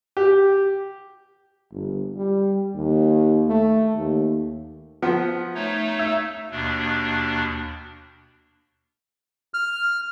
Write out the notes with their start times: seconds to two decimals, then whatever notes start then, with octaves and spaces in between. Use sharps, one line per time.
0.17 G4
1.72 G1
2.16 G3
2.74 D#2
3.48 A3
3.95 D#2
5.02 F3 B3
5.55 A3 D#4 C#5
5.99 E5
6.51 D#2 B2 D4
9.54 F6